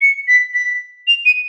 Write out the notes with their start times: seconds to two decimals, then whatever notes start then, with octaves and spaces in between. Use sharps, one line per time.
0.02 C#7
0.28 B6
0.54 B6
1.08 F7
1.25 D#7